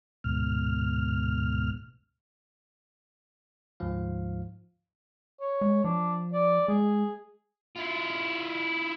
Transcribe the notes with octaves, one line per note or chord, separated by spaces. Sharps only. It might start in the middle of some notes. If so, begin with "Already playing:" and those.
D2 G#2 B2 F6
D2 G#2 F3 F5
C#5
G#3
F3 D4
D5
G#3 G#4
E4 F4